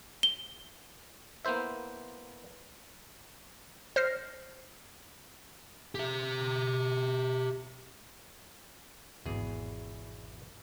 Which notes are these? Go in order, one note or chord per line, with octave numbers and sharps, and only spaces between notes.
G7
A#3 B3 E4 C5 E5
C5 F6 A#6 C7
G4 E5
D#1 G#1 E2 B2 G#4